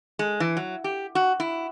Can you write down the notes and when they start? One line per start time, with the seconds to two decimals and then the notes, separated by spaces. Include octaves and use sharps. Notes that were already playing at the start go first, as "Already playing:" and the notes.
0.19 G#3
0.40 E3
0.57 F#3
0.84 G4
1.15 F#4
1.40 E4